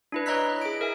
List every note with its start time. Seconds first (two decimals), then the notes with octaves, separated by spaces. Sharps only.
0.12 D4 E4 B4
0.26 C#5 D#5 A#5 E6 F#6 B6
0.61 G#4 D7
0.81 A#4 E5 G#5